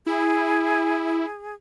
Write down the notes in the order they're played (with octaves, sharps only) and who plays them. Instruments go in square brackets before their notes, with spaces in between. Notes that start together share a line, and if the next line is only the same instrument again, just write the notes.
[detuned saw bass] E4 [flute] G#4